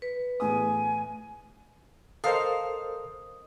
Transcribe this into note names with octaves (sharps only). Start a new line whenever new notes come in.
B4
E2 A2 G#5 D#6
A4 A#4 C5 D#5 F5 D#6